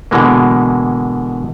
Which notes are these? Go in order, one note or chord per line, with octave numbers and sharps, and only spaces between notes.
B2 D3 E3 G#3 A#3